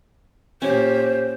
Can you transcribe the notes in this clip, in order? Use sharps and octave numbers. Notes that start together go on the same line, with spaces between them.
A#2 C#4 G4 C5